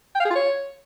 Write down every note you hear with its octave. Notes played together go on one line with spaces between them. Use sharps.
G5
F5
G#4
F4
C#5